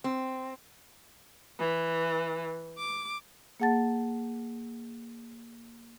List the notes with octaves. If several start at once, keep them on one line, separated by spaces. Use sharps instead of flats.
C4
E3
D6
A#3 G#4 F#5 A5 A6